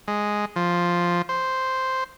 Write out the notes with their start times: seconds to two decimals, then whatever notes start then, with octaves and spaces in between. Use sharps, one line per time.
0.08 G#3
0.56 F3
1.29 C5